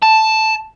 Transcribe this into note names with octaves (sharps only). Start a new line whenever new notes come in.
A5